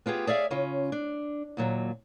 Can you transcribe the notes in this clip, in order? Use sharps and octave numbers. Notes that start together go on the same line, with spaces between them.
B3 F4 G4 G#4
G#4 D5 E5 F5
C#3 C#4 F4
D4
D#2 A#2 F#3